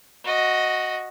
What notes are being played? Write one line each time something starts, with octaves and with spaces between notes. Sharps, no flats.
F#4 D#5